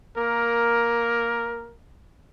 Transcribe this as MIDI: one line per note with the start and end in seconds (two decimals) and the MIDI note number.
0.17 1.74 58
0.17 1.74 70